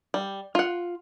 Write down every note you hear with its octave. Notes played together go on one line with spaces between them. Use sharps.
G3
F4 F#5